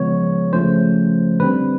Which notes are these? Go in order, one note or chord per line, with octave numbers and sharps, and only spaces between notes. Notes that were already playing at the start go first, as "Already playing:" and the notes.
Already playing: C#3 F3 G#3 B3 C#5
C#3 F3 A3 C#4 C5
D3 G3 C4 B4